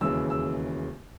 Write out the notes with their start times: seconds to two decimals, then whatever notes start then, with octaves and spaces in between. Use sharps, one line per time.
0.01 E1 D#2 C#3 E3 E6
0.30 E6